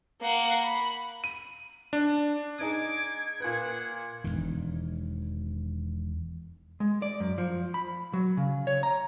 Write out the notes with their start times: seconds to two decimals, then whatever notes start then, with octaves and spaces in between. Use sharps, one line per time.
0.22 A#3 F#5
0.62 B5
1.24 D#7
1.93 D4
2.59 G#3 D4 D#4 G#4 D6 G#6
3.40 A#2 G#4 B4 F#5
4.24 E1 B1 D#3
6.80 G#3
7.02 D5
7.20 F#2
7.38 F3
7.74 B5
8.13 F#3
8.37 C#3
8.67 C#5
8.83 A#5